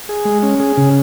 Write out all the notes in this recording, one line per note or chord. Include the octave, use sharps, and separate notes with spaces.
G#4
G#3
C#4
G#4
C#3